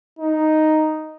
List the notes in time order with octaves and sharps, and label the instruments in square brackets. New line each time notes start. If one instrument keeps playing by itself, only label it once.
[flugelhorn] D#4